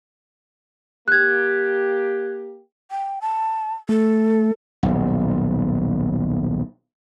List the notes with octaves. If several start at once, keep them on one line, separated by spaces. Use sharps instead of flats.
A#3 G4 F#6 G#6
G5
A5
A3 A4
D#1 B1